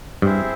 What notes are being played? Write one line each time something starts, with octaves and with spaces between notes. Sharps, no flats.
G2 C4 E4 G#4 C5 E5